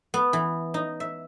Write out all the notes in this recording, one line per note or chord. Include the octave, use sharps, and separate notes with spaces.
B3
E3
D#4
E5